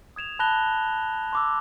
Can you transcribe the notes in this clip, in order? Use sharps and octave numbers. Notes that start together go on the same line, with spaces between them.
D#6 G#6 E7 F7
A5 B5 F#6 A#6 F7 G7
C6 D6 E6